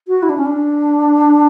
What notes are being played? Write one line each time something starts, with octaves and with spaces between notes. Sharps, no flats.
F#4
E4
D4
C#4
D4